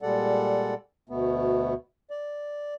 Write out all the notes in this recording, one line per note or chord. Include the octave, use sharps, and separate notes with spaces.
A#2 G3 G#3 A4 D5 F#5
D2 B2 A3 B3
D5